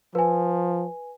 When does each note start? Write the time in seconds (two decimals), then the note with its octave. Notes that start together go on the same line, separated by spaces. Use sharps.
0.15 F3 B4 G#5